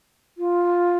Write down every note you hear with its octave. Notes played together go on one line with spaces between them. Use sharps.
F4